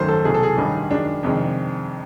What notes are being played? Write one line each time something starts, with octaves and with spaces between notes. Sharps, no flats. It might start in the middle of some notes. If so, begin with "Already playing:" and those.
Already playing: G#1 F#2 D#3 F#3 A3 C5
A4
C2 B2 F#3 A3 G#4
A4
G#4
A1 G2 D#3 G3
F#2 D#3 G#3 D4
F2 C3 D#3 G#3